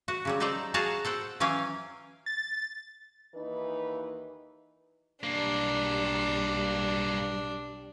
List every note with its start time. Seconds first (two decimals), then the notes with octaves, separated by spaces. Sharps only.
0.08 F#4 F#5
0.25 C#3 F#3 G3
0.40 D#4 A4 C5 D5 A#5
0.74 F#4 G#4 F5 F#5 A5 A#5
1.05 A4 C5 F#5 G5
1.40 E3 F#3 C#4 F5 G5 G#5
2.26 A6
3.35 D#2 E3 D#4 B4
5.24 B1 G2 G3 A#3 D4